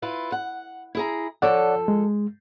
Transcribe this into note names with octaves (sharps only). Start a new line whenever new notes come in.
E4 F4 B4
F#5
E4 G#4 A#5
F3 A4 C#5 D5 F#5
G#3